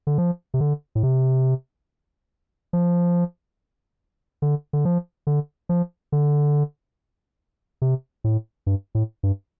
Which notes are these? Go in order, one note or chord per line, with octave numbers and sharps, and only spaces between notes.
D3
F3
C3
D3
A2
C3
F3
D3
D3
F3
D3
F3
D3
C3
A2
G2
A2
G2